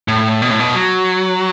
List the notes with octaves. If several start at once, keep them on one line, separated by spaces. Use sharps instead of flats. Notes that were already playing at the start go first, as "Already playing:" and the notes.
A2
B2
A2
B2
F#3